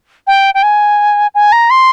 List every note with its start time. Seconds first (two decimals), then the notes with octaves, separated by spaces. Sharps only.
0.27 G5
0.54 G5
0.63 G#5
1.35 G#5
1.52 A#5
1.70 C6